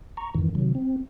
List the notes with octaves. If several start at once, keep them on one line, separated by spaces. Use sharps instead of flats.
A#5 C#6
F2 G#2 D#3 E3
C3 D#3 F#3
C4